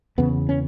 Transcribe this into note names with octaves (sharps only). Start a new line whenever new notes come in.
E2 C#3 B3
C#4